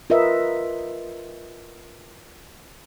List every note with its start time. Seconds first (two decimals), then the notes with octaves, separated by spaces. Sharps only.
0.10 F4 A#4 B4 D#5 E5